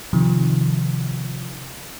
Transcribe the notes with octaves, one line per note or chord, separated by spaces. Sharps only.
C3 D#3 F3